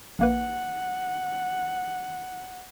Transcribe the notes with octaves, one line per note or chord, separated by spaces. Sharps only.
A#1 A#3 B4 F#5